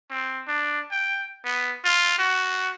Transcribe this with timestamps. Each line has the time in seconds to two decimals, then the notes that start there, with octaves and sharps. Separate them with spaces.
0.10 C4
0.47 D4
0.91 G5
1.45 B3
1.84 F4
2.18 F#4